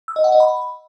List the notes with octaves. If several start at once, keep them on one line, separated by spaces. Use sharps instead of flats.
E6
D#5
F#5
D#5
B5